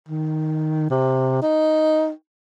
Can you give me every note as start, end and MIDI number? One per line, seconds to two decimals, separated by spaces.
0.09 0.87 51
0.90 1.41 48
1.42 2.10 63